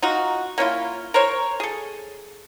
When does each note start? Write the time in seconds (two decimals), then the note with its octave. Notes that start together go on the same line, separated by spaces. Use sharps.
0.02 D#4 F4 F#4
0.58 A#3 C#4 E4 F4
1.14 A#4 C5 C#5
1.60 G#4 A4